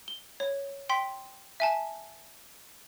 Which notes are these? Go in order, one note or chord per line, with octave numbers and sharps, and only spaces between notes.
G7
C#5
G5 C6 B6
E5 G#5 A5